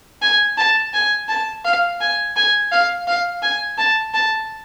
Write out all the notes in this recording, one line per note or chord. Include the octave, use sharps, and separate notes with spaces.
G#5
A5
G#5
A5
F5
G#5
G#5
F5
F5
G#5
A5
A5